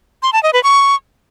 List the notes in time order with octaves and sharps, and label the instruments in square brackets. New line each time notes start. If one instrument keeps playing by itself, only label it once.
[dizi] C6
A5
D#5
B4
C#6